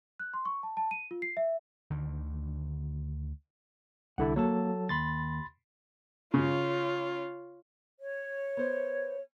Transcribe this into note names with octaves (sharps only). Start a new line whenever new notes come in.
F#6
C6
C#6
A5
A5
D#7
F4
C7
E5
D2 D3 D#3
C2 D3 E4 A4 F#5
F#3 A#3 A4 A5
D#2 B5 C6 A6
C#3 F4 C#5
C#5
B3 C5 D5